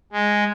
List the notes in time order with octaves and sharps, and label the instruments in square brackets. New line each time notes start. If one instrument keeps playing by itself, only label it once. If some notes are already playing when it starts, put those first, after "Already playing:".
[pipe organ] G#3